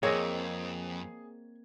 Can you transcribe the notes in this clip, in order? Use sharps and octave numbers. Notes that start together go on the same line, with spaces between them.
F2 A#3 C4 G#4 C#5 D#5